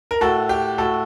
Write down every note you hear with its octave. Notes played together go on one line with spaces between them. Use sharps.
A#4
A2 F#4 A4
G4
A2 F#4 A4